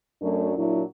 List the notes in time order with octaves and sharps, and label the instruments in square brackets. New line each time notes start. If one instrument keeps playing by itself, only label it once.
[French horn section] F#2 F#3 A3 D4
A#2 F#3 D4 E4